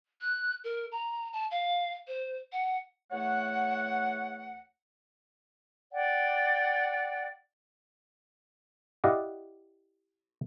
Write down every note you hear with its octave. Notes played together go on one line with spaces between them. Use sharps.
F#6
A#4
A#5
A5
F5
C5
F#5
E2 A3 C#5 F#5
D5 F#5 G5
E4 G4 D5 D#5 F5 F#5